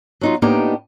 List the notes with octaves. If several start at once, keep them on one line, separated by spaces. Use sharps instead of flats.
F#3 D#4 F4
A2 A#3 B3 D4 D#4 G4